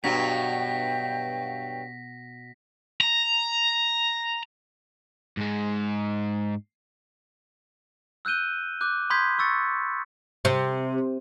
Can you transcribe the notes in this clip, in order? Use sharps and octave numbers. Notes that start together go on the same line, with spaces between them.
G2 B2 F#3 G5 A#6 B6
A#5
G#2 G#3
E6 F#6 G6 D#7 G7
D6 F#6 G6
B5 C6 D#6 G6 G#6 B6
C#6 E6 A6 C#7
C3